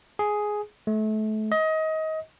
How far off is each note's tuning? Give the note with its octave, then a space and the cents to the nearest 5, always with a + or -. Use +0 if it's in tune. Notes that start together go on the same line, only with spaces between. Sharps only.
G#4 +5
A3 -30
D#5 +25